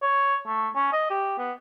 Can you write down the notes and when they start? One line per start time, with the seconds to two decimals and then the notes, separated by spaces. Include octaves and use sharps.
0.02 C#5
0.46 A3
0.76 C#4
0.93 D#5
1.10 G4
1.38 B3